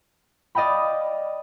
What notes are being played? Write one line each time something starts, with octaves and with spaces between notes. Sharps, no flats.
D5 D#5 F5 G5 B5